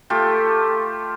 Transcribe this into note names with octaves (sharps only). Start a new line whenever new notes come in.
A3 F4 G4